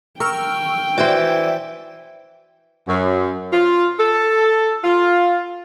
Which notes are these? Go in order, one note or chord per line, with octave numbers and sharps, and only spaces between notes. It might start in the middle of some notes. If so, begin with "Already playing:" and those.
A#4 G5 C#6 E6 F6
E3 F#4 C5 D5 E5
F#2
F4
A4
F4